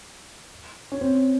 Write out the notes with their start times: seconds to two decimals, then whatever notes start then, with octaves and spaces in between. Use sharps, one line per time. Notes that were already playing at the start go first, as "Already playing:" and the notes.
0.92 C#4
1.01 C4